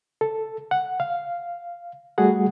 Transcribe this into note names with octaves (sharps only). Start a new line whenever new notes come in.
A4
F#5
F5
G3 A3 F#4 G#4 F#5